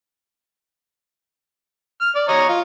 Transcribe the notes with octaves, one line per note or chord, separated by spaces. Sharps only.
F6
D5
C#5 D#5 A#5
F4